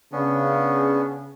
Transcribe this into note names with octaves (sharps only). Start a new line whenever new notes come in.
C#3 B3 C#4 D4